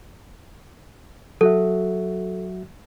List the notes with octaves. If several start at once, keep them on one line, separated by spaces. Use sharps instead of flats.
F#3 F#4 A4 E5